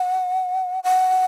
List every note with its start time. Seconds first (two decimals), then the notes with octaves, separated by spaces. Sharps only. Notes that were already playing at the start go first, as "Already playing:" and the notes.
Already playing: F#5
0.84 F#5